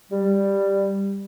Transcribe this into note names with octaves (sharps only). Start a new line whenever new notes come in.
G3